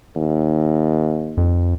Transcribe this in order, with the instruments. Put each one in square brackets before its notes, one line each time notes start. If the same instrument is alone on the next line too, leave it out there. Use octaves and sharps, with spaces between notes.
[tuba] D#2
[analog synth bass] F2